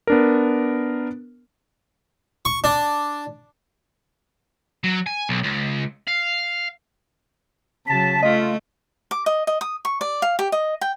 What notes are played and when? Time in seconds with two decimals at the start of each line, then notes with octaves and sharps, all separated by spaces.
0.07 B3 D4 A#4
2.45 C#6
2.64 D4
4.84 F#3
5.06 G#5
5.29 B1
5.44 C#2
6.08 F5
7.87 C#3 F#3 A5 B6
8.23 A3 F4 D#5
9.11 D6
9.26 D#5
9.47 D#5
9.61 D#6
9.85 C#6
10.01 D5
10.22 F5
10.39 G4
10.52 D#5
10.81 G5